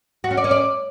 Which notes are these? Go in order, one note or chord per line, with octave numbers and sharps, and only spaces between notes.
F#4
C#4
D5
C#4
D5